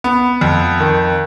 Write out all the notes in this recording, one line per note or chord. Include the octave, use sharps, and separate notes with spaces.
B3
F2
D#3